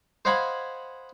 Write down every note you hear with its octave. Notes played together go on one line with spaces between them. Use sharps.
C5 D#5 F5 F#5 G#5 B5